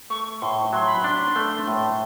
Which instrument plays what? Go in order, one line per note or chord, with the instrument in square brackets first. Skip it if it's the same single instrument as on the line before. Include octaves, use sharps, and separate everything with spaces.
[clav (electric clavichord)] A3 [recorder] C#6
[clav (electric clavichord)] A2 [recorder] C6
[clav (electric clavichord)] F#3 [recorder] C6
[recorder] B5
[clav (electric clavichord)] D4 [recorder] C6
[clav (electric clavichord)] A3
A2